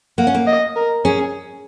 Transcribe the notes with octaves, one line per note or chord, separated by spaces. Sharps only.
A#3 F#5
C#4
A#3
D#5
A#4
C#4 G#4